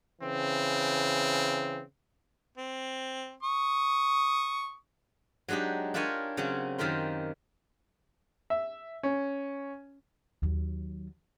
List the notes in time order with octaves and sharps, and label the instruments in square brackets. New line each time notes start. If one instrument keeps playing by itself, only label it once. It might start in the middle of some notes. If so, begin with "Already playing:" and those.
[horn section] C#3 E3 C4
[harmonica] C4
C#6 D#6
[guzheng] F#3 G#3 D4 D#4 G4
D4 F4 G4 A#4 C#5 G#5
C#3 F#3 C4 C#4
F#2 D#3 F4 G4 A#4 C6
[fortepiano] E5
C#4
[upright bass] D#2 F#3